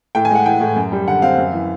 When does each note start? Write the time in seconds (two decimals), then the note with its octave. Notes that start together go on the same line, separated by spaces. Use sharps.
0.15 A2 G5
0.25 G#5
0.30 G#3 F#5
0.46 E3 G5
0.60 A2
0.76 F#2
0.92 G3
1.07 D3 F#5
1.22 C4 F5
1.38 F#2
1.53 E3